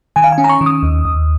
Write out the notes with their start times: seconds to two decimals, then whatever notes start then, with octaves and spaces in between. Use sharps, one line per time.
0.16 D#3 G#5
0.24 F5
0.32 G#5
0.38 C#4
0.44 A#5
0.49 C#6
0.61 D#3
0.66 D#6
0.83 D#2
1.05 D#2